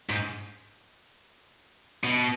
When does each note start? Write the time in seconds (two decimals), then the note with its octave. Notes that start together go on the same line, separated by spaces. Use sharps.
0.10 G#2
2.04 B2